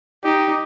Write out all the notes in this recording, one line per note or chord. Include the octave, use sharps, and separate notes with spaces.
D#4 G4